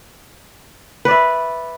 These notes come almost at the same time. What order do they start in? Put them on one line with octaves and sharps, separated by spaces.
B4 D5 E5